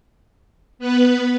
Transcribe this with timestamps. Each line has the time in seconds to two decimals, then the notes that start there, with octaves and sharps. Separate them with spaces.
0.79 B3 B4